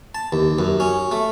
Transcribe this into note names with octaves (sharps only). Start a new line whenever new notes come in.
A5
D#2
F#2
C#4
A3